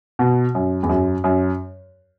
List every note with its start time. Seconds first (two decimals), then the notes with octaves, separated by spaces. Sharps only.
0.19 B2
0.55 F#2
0.83 E2
0.89 F#2
1.24 F#2